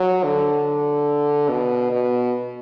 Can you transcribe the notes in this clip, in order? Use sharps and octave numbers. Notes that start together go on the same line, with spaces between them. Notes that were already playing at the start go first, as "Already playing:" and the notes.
Already playing: F#3
D3
B2
B2